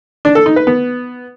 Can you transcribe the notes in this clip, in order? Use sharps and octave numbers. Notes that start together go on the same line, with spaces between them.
D4
A4
D#4
B4
B3